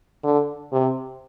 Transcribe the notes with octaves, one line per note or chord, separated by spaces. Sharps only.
D3
C3